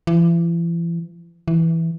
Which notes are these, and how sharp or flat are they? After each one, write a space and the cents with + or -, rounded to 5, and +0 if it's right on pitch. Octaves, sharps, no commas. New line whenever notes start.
E3 +40
E3 -5